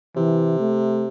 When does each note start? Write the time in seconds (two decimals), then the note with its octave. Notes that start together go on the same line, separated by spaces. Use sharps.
0.16 C3 E3
0.60 A3